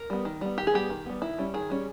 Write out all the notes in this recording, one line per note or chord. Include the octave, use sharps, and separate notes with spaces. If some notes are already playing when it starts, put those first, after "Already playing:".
Already playing: A#4
G3 B3
D#3
G3 B3
D#3 G4
G#4
G3 B3 G4
D#3
G3 B3
D#3 E4
G3 C#4
D#3 G#4
G3 C#4